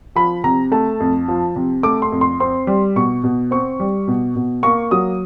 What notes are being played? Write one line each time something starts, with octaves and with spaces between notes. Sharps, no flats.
F3 B5
C3 A#5
A3 A5
F2
F3
C3
A3 D6
C6
F2
C6
C4 C6
G3
B2 C#6
B2
C4 C#6
G3
B2
B2
A#3 C#6
F#3 D#6